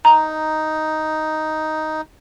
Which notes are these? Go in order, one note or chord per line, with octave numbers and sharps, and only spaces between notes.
D#4 A#5